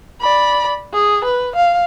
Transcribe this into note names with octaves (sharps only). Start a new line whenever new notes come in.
D5 B5
G#4
B4
F5